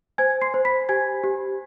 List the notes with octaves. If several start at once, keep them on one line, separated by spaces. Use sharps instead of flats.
C5 G#5 G#6
C6 C7
C5
B5 B6
G4 G#5 G#6
G4